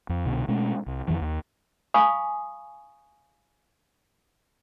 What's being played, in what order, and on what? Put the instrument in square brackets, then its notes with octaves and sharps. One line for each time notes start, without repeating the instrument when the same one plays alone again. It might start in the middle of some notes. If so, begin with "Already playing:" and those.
[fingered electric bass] F2
C2 B2 D3
B2 G#3 A3 C#4
C2
F2 D#3 E3
D#2
[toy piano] F5 G#5 B5 C#6 D#6